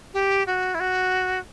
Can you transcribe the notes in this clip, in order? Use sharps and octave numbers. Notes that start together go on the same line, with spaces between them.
G4
F#4
E4
F#4